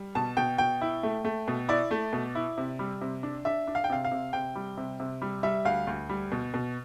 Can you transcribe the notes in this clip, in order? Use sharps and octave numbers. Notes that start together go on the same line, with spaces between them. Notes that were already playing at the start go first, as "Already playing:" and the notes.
Already playing: G3
B2 A5
B2 G5
B2 G5
E4
A3
A3
B2
E4 D5
A3
B2
E4
C3
G3
C3
D4
D4 E5
D4
F5
G5
C3 F5
F5
C3
C3 G5
G3
C3
C3
G3
G3 E5
D2 F5
D2
G3
B2
B2